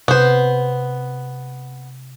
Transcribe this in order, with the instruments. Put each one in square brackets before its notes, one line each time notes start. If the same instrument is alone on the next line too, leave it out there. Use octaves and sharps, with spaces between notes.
[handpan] C3 [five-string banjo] B3 C5